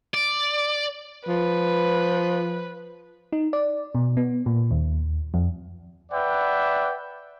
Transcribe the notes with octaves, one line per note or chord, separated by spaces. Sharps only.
D5
F3 B4
D#4
D5
B2
B3
A#2
D#2
F2
B4 D5 E5 F#5 G5